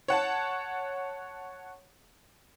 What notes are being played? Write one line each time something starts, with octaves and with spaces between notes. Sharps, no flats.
C#5 F#5 A5